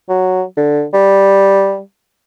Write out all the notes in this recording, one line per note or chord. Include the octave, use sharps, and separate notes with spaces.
F#3
D3
G3